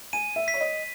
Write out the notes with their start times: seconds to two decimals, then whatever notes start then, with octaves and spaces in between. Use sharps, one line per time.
0.13 G#5 D#7
0.36 E5
0.48 B6
0.54 C#5
0.61 D#5